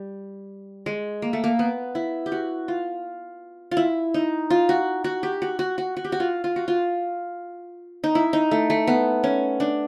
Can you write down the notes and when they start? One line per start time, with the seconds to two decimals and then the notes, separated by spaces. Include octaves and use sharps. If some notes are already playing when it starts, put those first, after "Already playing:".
Already playing: G3
0.86 G#3
1.22 A#3
1.33 A3
1.44 A#3
1.59 B3
1.95 E4
2.26 G4
2.32 F#4
2.68 F4
3.71 F4
3.77 E4
4.14 D#4
4.50 F4
4.69 F#4
5.04 F#4
5.23 G4
5.42 F#4
5.59 F#4
5.78 F#4
5.97 F#4
6.04 G4
6.12 F#4
6.20 F4
6.44 F4
6.56 F#4
6.68 F4
8.04 D#4
8.15 E4
8.33 D#4
8.51 A3
8.70 A3
8.87 B3
9.24 C#4
9.60 D4